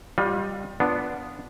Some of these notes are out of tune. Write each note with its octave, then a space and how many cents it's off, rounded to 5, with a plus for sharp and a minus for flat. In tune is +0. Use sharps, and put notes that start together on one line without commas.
G3 +0 F4 +35 D#5 +0
B3 +0 D4 +0 F4 +0